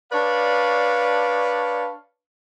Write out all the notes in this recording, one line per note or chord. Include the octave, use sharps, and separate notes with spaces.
D4 B4 C#5 D5 F5